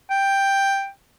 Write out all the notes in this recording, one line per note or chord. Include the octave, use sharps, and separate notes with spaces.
G5